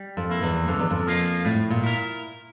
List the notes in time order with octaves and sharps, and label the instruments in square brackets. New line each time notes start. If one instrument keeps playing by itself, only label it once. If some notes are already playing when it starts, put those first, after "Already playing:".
Already playing: [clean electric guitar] G3
[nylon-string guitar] F2
[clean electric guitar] A#3 E4
[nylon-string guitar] E2
[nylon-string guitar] F2 [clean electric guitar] D3
[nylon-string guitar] E2
F2
[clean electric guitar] F3 A#3 F4
[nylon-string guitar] A2 [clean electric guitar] A3
[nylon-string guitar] A#2
[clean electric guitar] E4 A#4